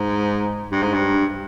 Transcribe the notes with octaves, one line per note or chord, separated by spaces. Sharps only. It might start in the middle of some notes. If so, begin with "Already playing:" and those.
Already playing: G#2
G2
G#2
G2